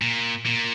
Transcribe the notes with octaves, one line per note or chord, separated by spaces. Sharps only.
A#2
A#2